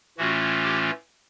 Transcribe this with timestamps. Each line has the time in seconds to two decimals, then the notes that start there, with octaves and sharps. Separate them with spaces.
0.18 A2 E3 A3 C#4 F4 F#4
0.64 G4